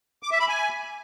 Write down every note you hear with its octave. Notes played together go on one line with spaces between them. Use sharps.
D6
E5
B5
G#5